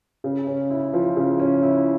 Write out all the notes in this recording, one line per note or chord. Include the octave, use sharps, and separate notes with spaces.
C#3
C#4
E4
F3
C#3
C#4
E4